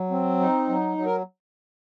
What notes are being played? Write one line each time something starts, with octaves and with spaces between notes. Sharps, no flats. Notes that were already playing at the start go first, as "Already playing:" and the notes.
Already playing: F#3
C4
D#4
F#3
F#3
A#4